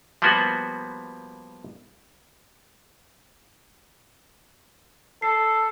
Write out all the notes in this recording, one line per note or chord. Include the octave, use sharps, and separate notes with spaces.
F3 G3 A#3 B3 F#4
A4 C7